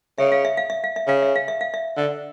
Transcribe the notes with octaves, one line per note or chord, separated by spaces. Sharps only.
C#3 E5
F5
E5
F5
E5
F5
E5
C#3 F5
E5
F5
E5
F5
E5
D3